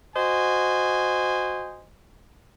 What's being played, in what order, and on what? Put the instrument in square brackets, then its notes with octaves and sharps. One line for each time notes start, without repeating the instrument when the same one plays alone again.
[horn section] F#4 C5 D#5 G#5